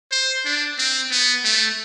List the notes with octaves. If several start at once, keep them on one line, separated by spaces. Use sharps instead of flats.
C5
D4
C4
B3
A3